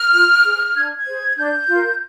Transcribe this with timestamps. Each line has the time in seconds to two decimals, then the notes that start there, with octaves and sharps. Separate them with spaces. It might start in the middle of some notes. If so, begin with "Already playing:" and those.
Already playing: F6
0.13 F4
0.44 G#4 C5
0.75 D4 G#6
0.97 G#6
1.06 G#4 C5
1.37 D4 G6
1.69 F4 A#4